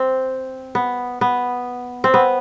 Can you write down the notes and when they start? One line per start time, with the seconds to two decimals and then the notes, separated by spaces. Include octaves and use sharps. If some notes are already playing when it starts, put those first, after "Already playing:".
Already playing: C4
0.75 B3
1.21 B3
2.04 C4
2.14 B3